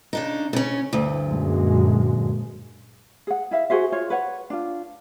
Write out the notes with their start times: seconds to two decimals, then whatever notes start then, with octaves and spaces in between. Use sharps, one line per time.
0.13 C#3 D4 D#4
0.53 C#3 C#4
0.93 D2 G2
1.26 F#2 A#2 G#3
3.27 G#4 F#5
3.51 E4 E5 F5
3.70 F#4 G#4 C5 E5
3.92 F4 C#5
4.10 B4 C#5 F#5
4.50 D4 F4